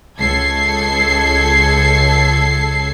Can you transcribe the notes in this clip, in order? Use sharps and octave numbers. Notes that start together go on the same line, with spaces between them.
C#2 A4 G#6 C7